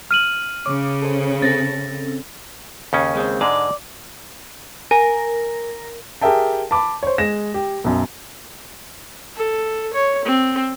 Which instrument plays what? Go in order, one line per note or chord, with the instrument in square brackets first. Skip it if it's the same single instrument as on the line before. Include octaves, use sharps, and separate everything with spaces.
[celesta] F6 D#7 F#7
[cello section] C#3 [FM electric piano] C#5 D6
[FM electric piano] A4 C5
[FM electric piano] C4 C#4 A4 [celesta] A6 A#6
[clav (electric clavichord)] D#2 C#3 C#4
[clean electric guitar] G#3 C4
[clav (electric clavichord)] G#2 D3 G#3 [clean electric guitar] D5
[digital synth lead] A#4 [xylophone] G#5
[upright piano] G4 G#4 A#4 E5 G5 A5
A5 B5 D6
C5 C#5
G#3 A#6 E7
G4
B1 F#2
[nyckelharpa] A4
C#5
C4